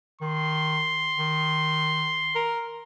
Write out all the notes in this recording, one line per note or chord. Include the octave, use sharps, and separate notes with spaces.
D#3 C6
D#3
A#4